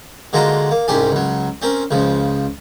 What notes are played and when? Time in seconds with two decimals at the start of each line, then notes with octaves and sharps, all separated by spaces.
0.33 D3 G#3 A#3 F4 F#4 A#5
0.71 A#3
0.88 C2 G#2 C#4 G4 G#5
1.12 C#2 F#3
1.62 C4 C#4 A#4
1.91 C#2 C#3 F3